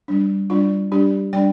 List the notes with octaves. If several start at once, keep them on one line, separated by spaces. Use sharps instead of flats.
G3 D4
G3 D4 F4
G3 D4 G4
G3 D4 D5 G5